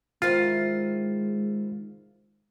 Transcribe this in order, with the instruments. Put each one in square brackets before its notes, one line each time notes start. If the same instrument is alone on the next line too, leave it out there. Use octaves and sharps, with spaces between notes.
[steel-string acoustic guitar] D#3 E4 C5 [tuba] G#3 [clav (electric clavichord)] F4